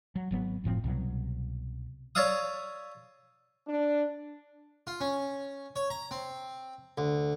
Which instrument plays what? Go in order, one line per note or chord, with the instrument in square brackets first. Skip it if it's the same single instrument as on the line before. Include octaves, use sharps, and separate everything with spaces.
[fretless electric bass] F#3
G#1 F#3 B3
F#1 A2 F3 C4
C2 B2 F#3
[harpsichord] C#5 D5 E5 F5 D#6
[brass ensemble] D4
[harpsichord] F4
C#4
C#5
A#5
C4
D2